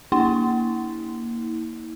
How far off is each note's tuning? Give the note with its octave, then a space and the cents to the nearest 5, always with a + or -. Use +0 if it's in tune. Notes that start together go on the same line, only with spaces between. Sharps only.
A#3 +0 E4 -40